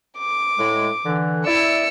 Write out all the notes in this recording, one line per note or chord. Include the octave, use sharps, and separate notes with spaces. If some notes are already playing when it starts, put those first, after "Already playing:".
D6
A2 G#3
D3 E3
E4 D5 E6 C#7